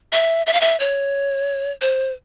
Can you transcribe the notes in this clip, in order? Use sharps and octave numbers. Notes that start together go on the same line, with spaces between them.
E5
E5
F5
E5
C#5
C5